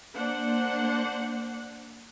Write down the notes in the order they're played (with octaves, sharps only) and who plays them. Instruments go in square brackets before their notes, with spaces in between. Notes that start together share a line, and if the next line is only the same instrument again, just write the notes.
[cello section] A#3 [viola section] D4 C5 F#5